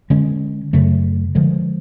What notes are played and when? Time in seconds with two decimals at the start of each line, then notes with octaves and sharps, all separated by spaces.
0.10 D3 G#3 C#4
0.73 F#2 C#3 F#3 A3
1.35 D3 F3 G#3